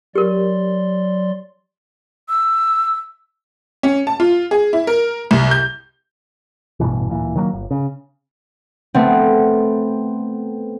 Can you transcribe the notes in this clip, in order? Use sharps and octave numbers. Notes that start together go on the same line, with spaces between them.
F#3 G4 A#4 D5 C6
E6
C#4
A5
F4
G#4
E4
A#4
C2
G6
A1 G2 B2 E3
D1 A#2 E3
D#3 F#3 G3 A#3
G1
C#3
A3 B3 C4